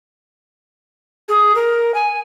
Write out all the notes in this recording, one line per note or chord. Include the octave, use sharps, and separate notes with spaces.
G#4
A#4
G#5